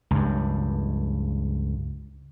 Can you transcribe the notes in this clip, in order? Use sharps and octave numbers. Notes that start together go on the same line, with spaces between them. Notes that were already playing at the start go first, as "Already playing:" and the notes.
C#2 G2